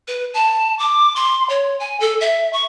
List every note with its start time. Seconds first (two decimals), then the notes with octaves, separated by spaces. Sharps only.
0.08 B4
0.34 A5
0.79 D6
1.16 C6
1.49 C#5
1.80 G#5
2.00 A4
2.21 E5
2.53 C#6